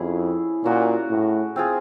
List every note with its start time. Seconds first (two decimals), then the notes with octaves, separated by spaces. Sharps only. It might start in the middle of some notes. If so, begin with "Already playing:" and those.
Already playing: F2 C#4 E4 G#4
0.64 A#2 C#4 F#4 A#4
1.10 A2
1.56 C4 F4 G#4